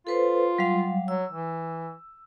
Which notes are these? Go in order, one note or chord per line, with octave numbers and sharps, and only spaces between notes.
F4 A4 B4 C5
F#3 G3 F5
F#3 E6
E3